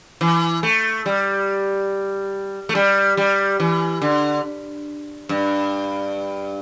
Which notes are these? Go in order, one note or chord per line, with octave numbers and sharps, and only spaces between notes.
E3
A3
G3
A3
G3
G3
E3
D3
G2